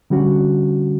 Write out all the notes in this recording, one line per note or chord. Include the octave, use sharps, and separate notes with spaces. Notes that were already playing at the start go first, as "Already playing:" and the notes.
D3 G3 C#4 F#4